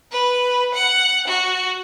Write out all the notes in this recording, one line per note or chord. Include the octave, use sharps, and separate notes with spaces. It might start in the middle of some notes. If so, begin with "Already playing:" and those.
B4
F#5
F#4